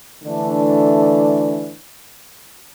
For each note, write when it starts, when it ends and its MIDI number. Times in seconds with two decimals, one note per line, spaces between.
0.24 1.73 50
0.24 1.73 52
0.24 1.73 57
0.24 1.73 62